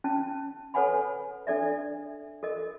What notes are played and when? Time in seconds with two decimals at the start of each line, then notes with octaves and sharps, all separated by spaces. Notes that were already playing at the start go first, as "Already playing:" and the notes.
0.04 C#4 A5
0.74 A4 B4 C#5 F#5 G#5 B5
1.47 D4 A4 D5 E5
2.43 A4 A#4 D#5